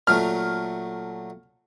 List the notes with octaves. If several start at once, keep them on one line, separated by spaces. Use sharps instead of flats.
A#2 F#3 A3 F6